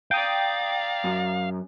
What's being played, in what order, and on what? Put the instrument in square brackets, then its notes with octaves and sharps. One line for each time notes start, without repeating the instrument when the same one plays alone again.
[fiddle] D5 A#5 [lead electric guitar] F5 [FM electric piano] G5 D#6
[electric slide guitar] F#2